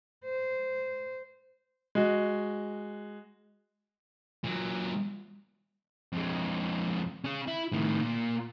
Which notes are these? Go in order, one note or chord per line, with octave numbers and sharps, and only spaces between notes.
C5
G#3 F#4
A#2 F#3
F2 G#3
C#4 G#4
E4
A2 D#3
A#2